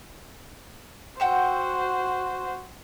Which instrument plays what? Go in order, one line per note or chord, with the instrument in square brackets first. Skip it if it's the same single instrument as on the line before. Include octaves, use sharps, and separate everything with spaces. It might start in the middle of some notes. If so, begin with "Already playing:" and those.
[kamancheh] F#4 C5 [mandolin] F#5 G5 E6